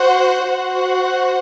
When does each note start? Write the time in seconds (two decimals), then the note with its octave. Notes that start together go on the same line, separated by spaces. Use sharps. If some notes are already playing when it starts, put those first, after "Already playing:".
Already playing: F#4 C5 F#5
0.45 F#4 C5 F#5